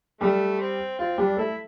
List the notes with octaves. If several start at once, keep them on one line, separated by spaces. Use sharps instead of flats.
G3 A3 G4
C4
C4 F4
G3 D4 G4
A3 E4 A4